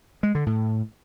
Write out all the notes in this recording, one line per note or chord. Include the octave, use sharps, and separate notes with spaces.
G#3
D3
A2